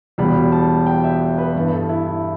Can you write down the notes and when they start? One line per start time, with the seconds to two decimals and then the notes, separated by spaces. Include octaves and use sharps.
0.18 E1 E2 B2 G3 B5
0.52 A5
0.86 G5
1.04 E5
1.38 B4
1.55 G2 E3 B3
1.73 A4
1.89 E4
2.06 E4